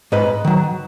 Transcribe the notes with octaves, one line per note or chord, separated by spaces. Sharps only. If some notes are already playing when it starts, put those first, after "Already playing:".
G#2 B4 D#5
D#3 F#3